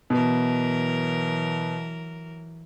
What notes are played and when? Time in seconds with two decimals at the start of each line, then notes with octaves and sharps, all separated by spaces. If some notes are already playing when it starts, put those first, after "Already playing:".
0.10 B2 E3 F#3 A#4